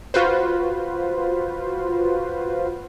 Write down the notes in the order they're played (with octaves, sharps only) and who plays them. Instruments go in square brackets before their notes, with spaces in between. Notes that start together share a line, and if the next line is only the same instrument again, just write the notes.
[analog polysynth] F4 F#4 B4 C5